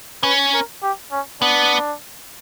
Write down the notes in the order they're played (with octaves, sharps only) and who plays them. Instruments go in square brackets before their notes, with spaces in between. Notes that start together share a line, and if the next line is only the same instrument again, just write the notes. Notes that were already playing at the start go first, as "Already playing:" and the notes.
[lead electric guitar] C#4 [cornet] B4
[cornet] A#4
G4
C#4
[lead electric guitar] B3 [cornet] D4